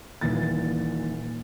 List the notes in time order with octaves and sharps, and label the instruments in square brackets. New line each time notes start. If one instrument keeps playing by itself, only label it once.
[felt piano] D#1 A#2 E3 A6